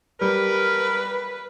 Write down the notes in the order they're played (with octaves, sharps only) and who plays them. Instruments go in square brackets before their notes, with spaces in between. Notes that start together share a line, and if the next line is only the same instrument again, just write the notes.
[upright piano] G3 [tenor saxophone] A#4 [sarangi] B4